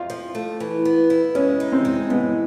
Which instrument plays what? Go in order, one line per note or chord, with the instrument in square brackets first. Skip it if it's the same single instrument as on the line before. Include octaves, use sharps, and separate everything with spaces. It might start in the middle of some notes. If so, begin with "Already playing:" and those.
Already playing: [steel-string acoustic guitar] F2 [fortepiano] F4
[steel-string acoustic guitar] F3
A3
E3
B3
E4
[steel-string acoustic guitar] G#3 [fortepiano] C#4
[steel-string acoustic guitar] D#4
[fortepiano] C4
[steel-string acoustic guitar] G#3
[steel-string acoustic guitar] A2 [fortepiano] B3